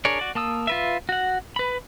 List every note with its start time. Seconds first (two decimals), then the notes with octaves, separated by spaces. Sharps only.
0.05 D4 G#4 A#4 C#5 D5
0.19 F#4 D5
0.35 A#3 A5 D#6 E6
0.67 F4 B4 E5
1.09 F#4 F#5
1.56 B4 B5